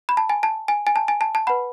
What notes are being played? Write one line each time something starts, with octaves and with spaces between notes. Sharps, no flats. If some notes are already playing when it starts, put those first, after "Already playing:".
B5
A5
G#5
A5
G#5
G#5
A5
G#5
A5
A5
B4 F#5 B5